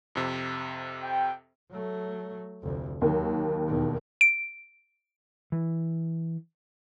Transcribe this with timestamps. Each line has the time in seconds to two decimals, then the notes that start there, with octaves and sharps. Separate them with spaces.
0.15 F2 C3
1.03 G5
1.71 F#3 A3
2.63 F1 D2
3.02 D#2 D#3 F#3
3.67 E2 B2
4.21 D7
5.52 E3